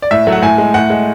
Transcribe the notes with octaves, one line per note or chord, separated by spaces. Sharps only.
D5
A2 E5
F#3 A3
F#5
A2 G#5
G#3
A2 F#5
G#3